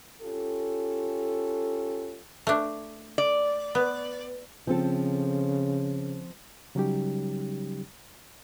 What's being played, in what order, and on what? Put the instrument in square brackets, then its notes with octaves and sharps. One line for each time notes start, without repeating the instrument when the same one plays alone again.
[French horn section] C#4 F4 G4 A4
[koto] A3 D4
[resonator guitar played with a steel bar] D5
[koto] B3
[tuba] C#3 [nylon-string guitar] F3 C4 A4
[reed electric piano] C#3 F#3 G3 C#4 D#4 G4